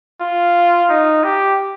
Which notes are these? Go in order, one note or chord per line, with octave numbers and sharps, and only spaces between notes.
F4
D#4
G4